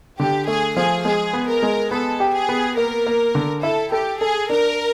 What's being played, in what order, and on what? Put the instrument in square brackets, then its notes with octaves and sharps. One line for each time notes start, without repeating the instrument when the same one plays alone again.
[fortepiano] D3 [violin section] G4
[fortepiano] A3 [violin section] G#4
[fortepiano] F3 [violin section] G#4
[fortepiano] G#3 [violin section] G#4
[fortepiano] B3
[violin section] A#4
[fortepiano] G#3
[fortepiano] B3 [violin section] A4
[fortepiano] G4
[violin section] G#4
[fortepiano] B3
[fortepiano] A#3 [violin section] A#4
[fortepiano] A#3
D3
[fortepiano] E4 [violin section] A4
[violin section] G4 [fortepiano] A4
[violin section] G#4 [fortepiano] A4
[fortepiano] D4 [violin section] A#4